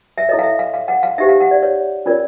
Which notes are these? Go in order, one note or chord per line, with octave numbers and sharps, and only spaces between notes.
E5
E4 A4 C#5 D#5
F5
E5
F5
F5
F#5
F5
D#4 G4 C5 E5
F5
F#5
D5
C#5
C#4 F4 A#4 C#5 D5